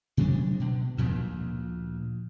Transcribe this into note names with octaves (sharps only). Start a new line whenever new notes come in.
C3 F#3 G#3 D4
B2
D2 A#2 F3